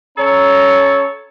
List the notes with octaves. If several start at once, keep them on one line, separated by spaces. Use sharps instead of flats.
C#4 A4 C#5 A#5